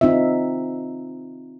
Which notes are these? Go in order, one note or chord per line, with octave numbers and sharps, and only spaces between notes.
C4 D#4 F4 E5